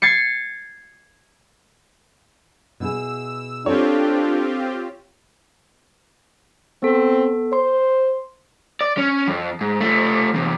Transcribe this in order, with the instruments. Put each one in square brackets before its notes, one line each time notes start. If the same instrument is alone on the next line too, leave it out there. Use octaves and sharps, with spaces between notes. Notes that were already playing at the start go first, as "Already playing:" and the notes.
[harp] G#6 A6 C7 C#7
[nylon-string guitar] B2 E4 G#4 [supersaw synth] E6
[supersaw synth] C4 F4 G4 [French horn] D4 [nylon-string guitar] A4 G5 [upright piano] C#5
[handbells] B3 A4 [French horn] C4
[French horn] C5 [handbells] C6
[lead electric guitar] D5
C#4
F2
G#2
F3 A3
E2 C3